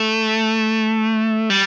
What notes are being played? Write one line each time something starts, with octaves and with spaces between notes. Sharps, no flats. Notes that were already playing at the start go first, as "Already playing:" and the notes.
Already playing: A3
G3